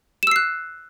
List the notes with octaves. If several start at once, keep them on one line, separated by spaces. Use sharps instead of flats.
E6 F#6 C7 E7